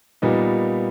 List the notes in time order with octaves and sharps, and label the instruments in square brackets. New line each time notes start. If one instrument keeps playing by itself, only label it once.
[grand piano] A#2 G3 B3 D#4